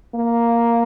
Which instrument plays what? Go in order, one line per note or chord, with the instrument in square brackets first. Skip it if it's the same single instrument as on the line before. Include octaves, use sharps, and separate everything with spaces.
[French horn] A#3